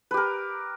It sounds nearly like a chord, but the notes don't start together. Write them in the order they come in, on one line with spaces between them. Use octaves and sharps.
B4 G4 A#4